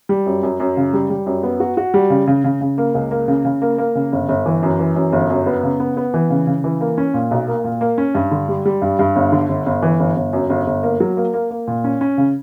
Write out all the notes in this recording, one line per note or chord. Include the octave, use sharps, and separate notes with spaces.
G3
F#2
F#2
F#2
C#3
G3
G3
F#2
B3
F#4
F#4
G3
C#3
C#3
C#3
C#3
A#3
C#2
A#3
C#3
C#3
A#3
A#3
C#3
G1
G1
E3
F#2
E3
F#2
G1
F#2
B3
C#3
B3
B3
E3
C#3
C#3
E3
A#3
C#4
A#2
B1
A#3
A#2
A#3
C#4
G2
D3
G3
G3
G2
G2
G1
D3
G1
G1
E3
G1
G1
F#2
G1
G1
A#3
F#3
A#3
A#3
A#3
A#2
C#4
C#4
C#3